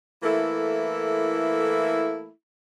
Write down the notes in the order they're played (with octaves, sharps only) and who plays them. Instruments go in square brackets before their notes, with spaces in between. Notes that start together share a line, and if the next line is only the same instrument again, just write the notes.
[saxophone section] E3 A3 A#3 E4 A4